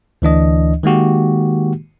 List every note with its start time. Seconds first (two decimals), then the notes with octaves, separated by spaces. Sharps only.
0.22 D2 E3 D4 D#5
0.83 D#3 G#3 A#3 F#4 G4